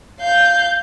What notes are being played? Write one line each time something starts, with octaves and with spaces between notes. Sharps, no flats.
F5 G6